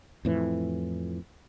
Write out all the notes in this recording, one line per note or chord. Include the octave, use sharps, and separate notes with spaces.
F2 A2 E3